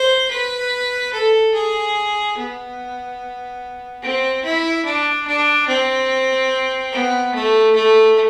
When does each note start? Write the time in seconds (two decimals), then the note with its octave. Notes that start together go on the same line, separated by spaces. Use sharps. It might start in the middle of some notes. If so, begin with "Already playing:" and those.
Already playing: C5
0.31 B4
1.13 A4
1.54 G#4
2.38 B3
4.02 C4
4.44 E4
4.85 D4
5.27 D4
5.68 C4
6.92 B3
7.34 A3
7.75 A3